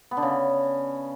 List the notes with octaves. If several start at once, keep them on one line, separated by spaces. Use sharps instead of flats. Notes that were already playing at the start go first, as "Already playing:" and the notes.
B3
D3
C#3